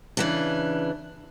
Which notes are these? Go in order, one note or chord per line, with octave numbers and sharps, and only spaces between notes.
C#3 E3 D4